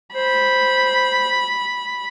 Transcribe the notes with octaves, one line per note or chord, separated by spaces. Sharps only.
C5 B5